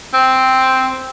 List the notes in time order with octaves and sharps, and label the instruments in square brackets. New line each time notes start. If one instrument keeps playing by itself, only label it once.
[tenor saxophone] C4